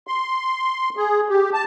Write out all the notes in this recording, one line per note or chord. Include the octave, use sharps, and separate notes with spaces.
C6
G#4
G4
A5